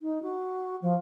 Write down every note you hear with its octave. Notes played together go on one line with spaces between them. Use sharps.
D#4
F#4
F3